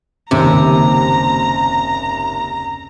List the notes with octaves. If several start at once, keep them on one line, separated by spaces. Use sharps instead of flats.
F#1 D#2 C3 A#5